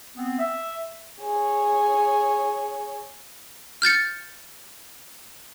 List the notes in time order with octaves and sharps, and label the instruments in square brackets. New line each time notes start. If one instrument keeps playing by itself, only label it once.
[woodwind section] B3 C4
E5
[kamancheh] G#4 C#5
[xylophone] F6 G6 A6 C#7